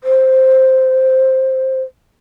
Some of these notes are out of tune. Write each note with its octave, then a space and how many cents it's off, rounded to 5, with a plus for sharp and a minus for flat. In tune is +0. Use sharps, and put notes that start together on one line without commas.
C5 +5